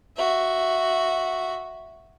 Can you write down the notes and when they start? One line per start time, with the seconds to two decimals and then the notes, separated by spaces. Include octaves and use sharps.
0.17 F#4 E5